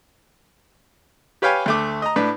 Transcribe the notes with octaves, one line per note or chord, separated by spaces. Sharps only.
G4 B4 C#5 F5 G5 G#5
D2 A3 D6
D#5 A#5
A2 D4 B4